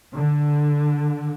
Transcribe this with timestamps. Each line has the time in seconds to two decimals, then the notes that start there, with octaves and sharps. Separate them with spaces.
0.14 D3